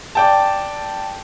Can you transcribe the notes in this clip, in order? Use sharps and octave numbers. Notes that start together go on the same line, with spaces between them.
D5 G5 A5